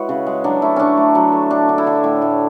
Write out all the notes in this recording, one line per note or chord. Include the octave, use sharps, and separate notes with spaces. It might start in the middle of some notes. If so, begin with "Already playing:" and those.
Already playing: G#3 E4 F#4 B4 C#5
C#3
G#3
F#3 D4
A3 E4
D3 C#4 D4
A3
F#3
A3
D3 D4
D3
E4
D3
A2
A2